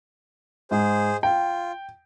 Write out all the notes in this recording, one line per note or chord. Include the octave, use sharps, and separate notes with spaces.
G#2 G#4 C5
F4 G5